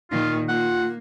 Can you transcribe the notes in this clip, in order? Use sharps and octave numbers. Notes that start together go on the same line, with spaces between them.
A#2 D#3 F4
A#3 F4 F#5